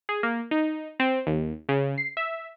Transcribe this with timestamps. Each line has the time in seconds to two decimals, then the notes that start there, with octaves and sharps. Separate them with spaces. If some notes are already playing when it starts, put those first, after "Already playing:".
0.09 G#4
0.23 A#3
0.51 D#4
1.00 C4
1.27 D#2
1.69 C#3
1.98 C7
2.17 E5